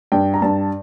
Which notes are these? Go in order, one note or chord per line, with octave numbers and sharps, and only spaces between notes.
G2 G5
A#5
G2 A5